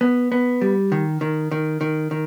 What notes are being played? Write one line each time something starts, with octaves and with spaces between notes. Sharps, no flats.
B3
B3
G3
D#3
D#3
D#3
D#3
D#3